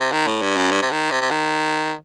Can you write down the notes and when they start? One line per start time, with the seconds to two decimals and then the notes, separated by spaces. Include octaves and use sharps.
0.01 C3
0.12 D#3
0.27 A2
0.42 G2
0.57 F#2
0.71 G2
0.82 C3
0.91 D#3
1.11 C3
1.21 C3
1.31 D#3